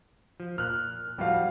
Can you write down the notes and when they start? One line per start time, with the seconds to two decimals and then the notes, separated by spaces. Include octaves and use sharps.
0.40 F3
0.58 A#2 F6 F#6
1.18 A2 F3 G3 A3 F#4 F5